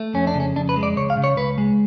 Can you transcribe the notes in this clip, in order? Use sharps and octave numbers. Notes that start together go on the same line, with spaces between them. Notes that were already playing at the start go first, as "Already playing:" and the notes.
Already playing: A3
F2 C#4
D4
C#3
C#4
F2 D4
B4
G#3
D5
C#2 C#5
F5
C#3
C#5
C#2 B4
G#3